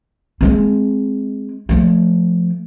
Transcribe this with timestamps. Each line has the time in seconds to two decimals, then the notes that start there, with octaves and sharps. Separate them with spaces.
0.41 G#3 C4
1.69 F3 A3